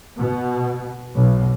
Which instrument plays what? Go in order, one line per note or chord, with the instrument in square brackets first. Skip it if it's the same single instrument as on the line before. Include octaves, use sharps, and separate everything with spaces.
[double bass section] B2
B1